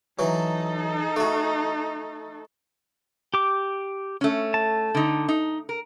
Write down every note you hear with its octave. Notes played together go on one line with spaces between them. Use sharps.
E3 F#3 D#4 A4
A3 F#4
G4 D6
A3 C#4
A5
D3 D#4
D#4
A#4